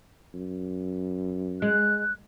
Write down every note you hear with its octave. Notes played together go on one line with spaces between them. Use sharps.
F#2
G#3 F#6